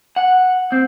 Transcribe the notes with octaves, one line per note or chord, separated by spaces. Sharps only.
F#5
C4